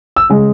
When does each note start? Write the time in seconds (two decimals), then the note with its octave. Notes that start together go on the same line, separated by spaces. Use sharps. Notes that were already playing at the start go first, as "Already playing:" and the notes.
0.16 E6
0.30 C#3 G#3